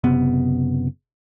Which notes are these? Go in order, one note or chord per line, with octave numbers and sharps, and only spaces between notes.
F#1 C3 B3